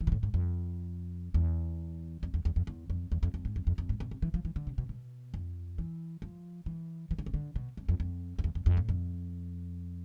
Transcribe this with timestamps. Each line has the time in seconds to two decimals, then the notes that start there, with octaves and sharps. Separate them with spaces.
0.01 E3
0.07 B2
0.12 A2
0.23 G#2
0.34 F2
1.34 E2
2.23 F2
2.34 E2
2.45 E2
2.56 F2
2.67 E2
2.90 F2
3.12 E2
3.23 F2
3.34 F2
3.45 G#2
3.56 F2
3.67 F2
3.78 F2
3.89 G#2
4.00 B2
4.11 C3
4.22 E3
4.34 F3
4.45 E3
4.56 D3
4.67 C3
4.78 B2
4.89 B2
5.34 F2
5.78 E3
6.22 F3
6.66 E3
7.11 E3
7.18 D3
7.26 C3
7.34 D3
7.56 B2
7.77 F2
7.89 F2
8.00 F2
8.39 F2
8.44 E2
8.55 F2
8.66 F2
8.77 A2
8.89 F2